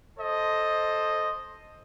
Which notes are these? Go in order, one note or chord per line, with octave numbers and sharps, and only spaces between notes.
A4 C5 D#5